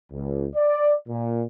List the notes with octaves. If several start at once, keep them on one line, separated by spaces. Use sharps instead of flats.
C#2
D5
A#2